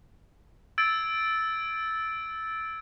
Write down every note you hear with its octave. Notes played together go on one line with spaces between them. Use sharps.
E6 G#6 A6 D7